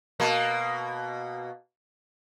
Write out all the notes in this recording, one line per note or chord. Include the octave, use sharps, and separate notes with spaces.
B2 A#3